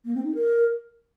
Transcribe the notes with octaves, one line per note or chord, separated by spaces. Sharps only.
A#3
C4
D#4
A#4